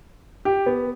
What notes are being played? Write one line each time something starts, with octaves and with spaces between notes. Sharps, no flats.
G4
B3